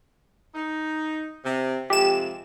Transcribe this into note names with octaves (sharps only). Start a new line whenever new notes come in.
D#4
C3
F2 C3 G#3 G4 E7